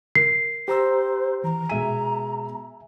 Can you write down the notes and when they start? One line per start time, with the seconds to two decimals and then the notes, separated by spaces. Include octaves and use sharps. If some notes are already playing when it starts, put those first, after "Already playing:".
0.15 A#4 C7
0.68 G4 C5 A#5 E6
1.44 E3 A#5
1.69 B2 G#3 E5 G#5 D#7